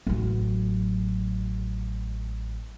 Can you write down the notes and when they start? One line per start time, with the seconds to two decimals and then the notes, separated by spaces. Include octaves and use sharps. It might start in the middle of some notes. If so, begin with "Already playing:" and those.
0.07 A1 F#3